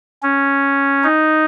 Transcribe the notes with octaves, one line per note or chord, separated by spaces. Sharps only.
C#4
D#4